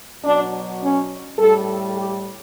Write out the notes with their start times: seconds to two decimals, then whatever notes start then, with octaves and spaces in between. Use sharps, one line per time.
0.24 B2 F#3 D4
0.82 C#4
1.38 A2 G3 A4
1.95 G4